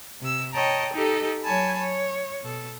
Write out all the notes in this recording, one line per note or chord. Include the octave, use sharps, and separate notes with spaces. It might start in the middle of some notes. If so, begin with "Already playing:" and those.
C3 E6
C#5 D#5 G5 A5 A#5
D#4 G4 A4 D#5
F#3 C#5 G#5 A5 B5
C#5
B2 A4